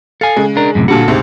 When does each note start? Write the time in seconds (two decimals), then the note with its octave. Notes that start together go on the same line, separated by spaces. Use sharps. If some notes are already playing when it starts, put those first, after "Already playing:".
0.21 A4 F5 G#5
0.36 C#3 G#3
0.57 D4 A#4
0.75 F#2 A2 C3
0.88 A#2 D3 G3 F#4 A4
1.08 D2 G#2 C3